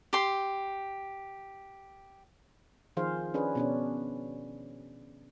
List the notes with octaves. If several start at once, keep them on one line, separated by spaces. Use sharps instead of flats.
G4 C6
D#3 F3 G#4 C5 F5
C#4 D4 G#4 B4
B2 C#4 D4